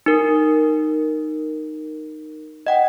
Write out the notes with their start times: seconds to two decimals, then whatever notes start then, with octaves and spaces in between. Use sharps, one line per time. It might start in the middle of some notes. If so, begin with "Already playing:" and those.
0.06 D#4 A#4
2.67 D#5 F#5 G5